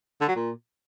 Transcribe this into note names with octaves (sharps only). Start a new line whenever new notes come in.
D3
F#3
A#2